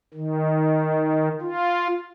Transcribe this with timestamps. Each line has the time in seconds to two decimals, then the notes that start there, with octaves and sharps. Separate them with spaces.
0.14 D#3
1.41 F4